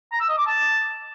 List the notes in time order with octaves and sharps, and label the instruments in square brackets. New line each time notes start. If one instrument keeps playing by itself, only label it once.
[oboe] A#5
E6
D#5
D6
A5